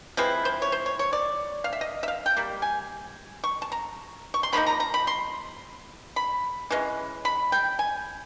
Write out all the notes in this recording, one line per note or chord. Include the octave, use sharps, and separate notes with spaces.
F3 G#3 C4 E4 B4
C5
C#5
C5
C#5
C#5
D5
F5
E5
D#5
E5
F5
G5
G3 A#3
G#5
C#6
A5
A#5
C#6
C6
C3 F3 A#3 D#4 B5
A#5
A#5
B5
C6
B5
E3 G#3 C#4
B5
G5
G#5